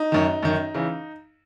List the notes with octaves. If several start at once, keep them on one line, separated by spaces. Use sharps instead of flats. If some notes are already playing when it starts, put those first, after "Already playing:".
Already playing: D#4
F#2 D#3
F#2 D#3
C#3 E3